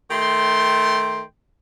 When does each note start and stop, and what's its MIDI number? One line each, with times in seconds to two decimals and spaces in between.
0.11 1.23 51
0.11 1.23 57
0.11 1.23 79
0.11 1.23 84